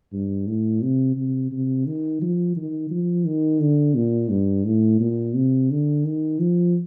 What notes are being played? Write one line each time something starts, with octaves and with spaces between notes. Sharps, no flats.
G2
A2
C3
C3
C3
D#3
F3
D#3
F3
D#3
D3
A#2
G2
A2
A#2
C3
D3
D#3
F3